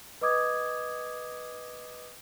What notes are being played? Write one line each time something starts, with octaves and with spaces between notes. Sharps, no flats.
B4 D#5 D6 D#6 G#6